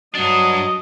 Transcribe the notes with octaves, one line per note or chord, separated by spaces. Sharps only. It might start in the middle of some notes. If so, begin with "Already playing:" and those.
G2 F#3 D4 D#5